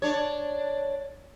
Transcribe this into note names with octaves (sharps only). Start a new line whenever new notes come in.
D4 C#5